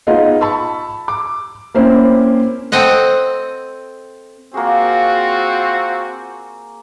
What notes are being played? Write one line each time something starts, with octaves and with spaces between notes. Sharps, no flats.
B3 D#4 F4 G#4 D#5 F5
A5 B5 C#6 E6
D6
A#3 C4 C#4 E4 C5
C4 A4 D#5 F#5
A#3 C4 F4 F#4 G#4